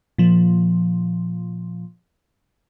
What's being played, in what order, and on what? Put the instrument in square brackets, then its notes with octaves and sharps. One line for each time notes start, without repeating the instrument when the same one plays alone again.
[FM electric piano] A#2 F3